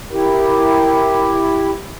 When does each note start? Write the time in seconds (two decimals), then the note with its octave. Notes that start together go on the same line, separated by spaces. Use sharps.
0.12 E4 G4 A#4